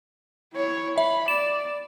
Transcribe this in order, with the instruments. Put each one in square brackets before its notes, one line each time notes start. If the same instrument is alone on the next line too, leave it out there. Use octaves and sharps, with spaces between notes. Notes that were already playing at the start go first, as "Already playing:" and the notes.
[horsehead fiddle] E4 C#5
[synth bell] E5 [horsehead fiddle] B5
[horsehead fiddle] D5 [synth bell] E7